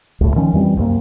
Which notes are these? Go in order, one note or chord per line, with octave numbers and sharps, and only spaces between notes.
C#2 A2
D#3 F3 C#4
F2 E3 G3 C4
C2 F#2 A#3